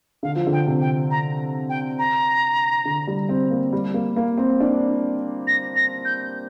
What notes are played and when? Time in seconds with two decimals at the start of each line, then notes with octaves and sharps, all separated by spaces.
0.23 D3 F5
0.35 F3
0.47 D3
0.52 G5
0.67 C3
0.81 G5
1.10 A#5
1.69 G5
1.98 A#5
2.85 D3
3.07 G3
3.29 C4
3.51 A#3
3.73 G3
3.94 A#3
4.16 A#3
4.38 C4
4.60 D4
5.47 A#6
5.76 A#6
6.05 G6